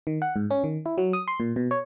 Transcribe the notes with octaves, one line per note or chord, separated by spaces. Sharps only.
D#3
F#5
G#2
C#4
D#3
E4
F#3
D#6
C6
A#2
B2
C#5